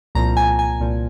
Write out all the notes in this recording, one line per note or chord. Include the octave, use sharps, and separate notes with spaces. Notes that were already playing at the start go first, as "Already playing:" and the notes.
C2 A#2 F3 A#5
G#5
G#5
C2 A#2 F3